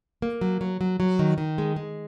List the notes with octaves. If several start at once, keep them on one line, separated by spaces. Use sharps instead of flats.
A#3
F#3
F#3
F#3
F#3
D#3
D#3
G#3
G#3